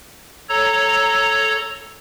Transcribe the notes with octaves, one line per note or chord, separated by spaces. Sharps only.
A4 C#5 A#5